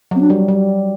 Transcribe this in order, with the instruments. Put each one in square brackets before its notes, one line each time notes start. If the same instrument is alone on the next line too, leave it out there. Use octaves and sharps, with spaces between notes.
[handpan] F#3 [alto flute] C4
[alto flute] D4
[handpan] G3
G3